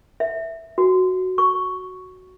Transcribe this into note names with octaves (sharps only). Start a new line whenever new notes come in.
E5
F#4
C#6